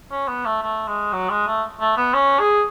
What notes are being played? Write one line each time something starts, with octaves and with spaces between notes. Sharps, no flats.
C#4
B3
A3
A3
G#3
F#3
G#3
A3
A3
B3
C#4
G#4